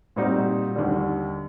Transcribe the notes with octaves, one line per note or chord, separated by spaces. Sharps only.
A#2 G3 C4 D#4 F#4
D#2 D3 G3